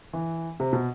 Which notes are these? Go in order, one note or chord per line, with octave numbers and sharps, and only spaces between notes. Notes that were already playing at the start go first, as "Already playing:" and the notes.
E3
C3
B2